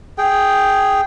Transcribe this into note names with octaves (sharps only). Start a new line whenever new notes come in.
G#4 G5